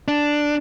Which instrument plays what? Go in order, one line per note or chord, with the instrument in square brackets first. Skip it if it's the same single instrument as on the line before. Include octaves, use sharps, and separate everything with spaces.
[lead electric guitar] D4